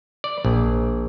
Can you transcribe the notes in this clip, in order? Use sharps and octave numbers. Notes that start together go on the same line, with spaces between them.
D5
A#1